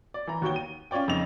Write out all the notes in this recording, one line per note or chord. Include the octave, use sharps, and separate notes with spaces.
D5
E3 A#5
D#2 F#4 C#5 G5 G7
D#7
C#4 F4 C#5 D5 G5
F2 C#3 C#4 D#4 F7